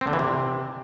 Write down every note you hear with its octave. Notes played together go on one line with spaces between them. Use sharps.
C4
D3
E3
C3